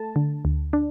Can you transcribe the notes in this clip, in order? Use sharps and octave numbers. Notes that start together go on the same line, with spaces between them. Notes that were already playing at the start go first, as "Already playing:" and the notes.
Already playing: A3 A5
D3
D2
D4